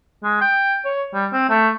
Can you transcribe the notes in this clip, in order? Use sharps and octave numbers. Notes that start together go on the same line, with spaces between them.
G#3
G5
C#5
G3
C4
A3